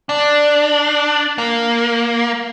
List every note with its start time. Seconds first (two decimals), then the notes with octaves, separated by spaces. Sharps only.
0.09 D4
1.38 A#3